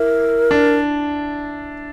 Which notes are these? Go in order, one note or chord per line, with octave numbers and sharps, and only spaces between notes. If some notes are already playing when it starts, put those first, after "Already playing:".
Already playing: E4 A#4
D4